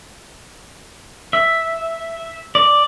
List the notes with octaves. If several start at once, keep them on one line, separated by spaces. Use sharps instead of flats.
E5
D5